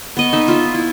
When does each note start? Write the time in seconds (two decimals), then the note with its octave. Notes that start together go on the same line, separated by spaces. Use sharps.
0.17 B3 D#5 C#6
0.33 D#4 E5
0.48 F4 E5
0.74 E4